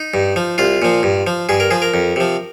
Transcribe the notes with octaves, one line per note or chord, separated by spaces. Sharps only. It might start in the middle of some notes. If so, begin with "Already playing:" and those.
Already playing: D#4
G2
F3
C2 F4
A#2 F3
G2
F3
G2 G#4
A#4
F3 G#4
A#4
F2
C3 F3